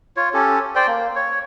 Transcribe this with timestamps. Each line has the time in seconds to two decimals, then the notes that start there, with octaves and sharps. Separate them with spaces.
0.17 F4 C#5
0.34 C#4 G4 A4
0.75 C5 D5 G5
0.87 A#3
1.16 C#5